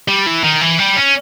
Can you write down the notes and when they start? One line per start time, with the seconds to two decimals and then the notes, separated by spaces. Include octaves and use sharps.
0.08 G3
0.26 E3
0.44 D#3
0.61 E3
0.79 G3
0.96 C#4